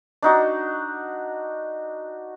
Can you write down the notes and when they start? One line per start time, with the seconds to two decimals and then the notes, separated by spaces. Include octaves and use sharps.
0.23 D4 D#4 F#4